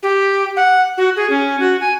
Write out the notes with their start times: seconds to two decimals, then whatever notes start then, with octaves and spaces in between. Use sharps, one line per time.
0.03 G4
0.57 F#5
0.97 F#4
1.16 G#4
1.30 C#4
1.60 F#4
1.81 G#5